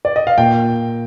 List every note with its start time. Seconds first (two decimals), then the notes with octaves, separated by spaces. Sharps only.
0.05 D5
0.16 D#5
0.27 F5
0.38 A#2 G5